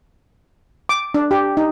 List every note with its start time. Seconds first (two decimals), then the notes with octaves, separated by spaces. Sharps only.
0.89 D6
1.14 D4
1.31 G4
1.57 D#4